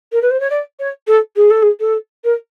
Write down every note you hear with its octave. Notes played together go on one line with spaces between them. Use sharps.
A#4
B4
C5
C#5
D5
C#5
A4
G#4
A4
G#4
A4
A#4